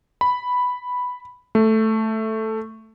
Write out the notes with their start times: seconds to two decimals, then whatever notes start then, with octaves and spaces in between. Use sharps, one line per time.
0.21 B5
1.55 A3